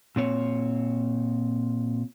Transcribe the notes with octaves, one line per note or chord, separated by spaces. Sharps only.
A#2 C4 C#5